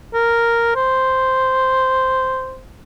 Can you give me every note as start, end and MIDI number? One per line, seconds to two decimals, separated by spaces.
0.14 0.74 70
0.75 2.60 72